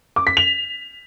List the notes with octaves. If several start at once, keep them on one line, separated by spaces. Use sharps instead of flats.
D6
B6
F7